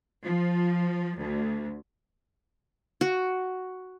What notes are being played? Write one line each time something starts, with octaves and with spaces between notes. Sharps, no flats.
F3
D2
F#4